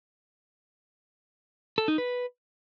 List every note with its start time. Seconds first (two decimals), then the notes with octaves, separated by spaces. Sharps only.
1.78 A4
1.88 D#4
1.98 B4